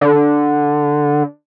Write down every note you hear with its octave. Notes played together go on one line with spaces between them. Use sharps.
D3